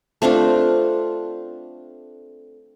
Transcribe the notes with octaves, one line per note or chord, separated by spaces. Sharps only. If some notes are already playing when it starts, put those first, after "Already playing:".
A3 C4 D4 F4